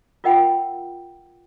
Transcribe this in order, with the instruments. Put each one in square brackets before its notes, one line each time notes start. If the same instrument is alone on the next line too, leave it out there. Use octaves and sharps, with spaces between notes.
[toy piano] F4 A#4 D#5 F#5 G5 B5